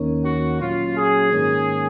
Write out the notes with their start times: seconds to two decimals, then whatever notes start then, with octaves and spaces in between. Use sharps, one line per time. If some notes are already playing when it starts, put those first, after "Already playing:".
Already playing: D#2 D#3 A#3 C#4
0.24 F#4
0.60 A#2 F#3 C#4 F4
0.96 G#4
1.33 G#2 D#3 A#3 C#4